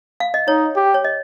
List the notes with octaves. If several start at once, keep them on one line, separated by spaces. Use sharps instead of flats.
F5
D#5
D#4 C#5
G4
C#5
D#5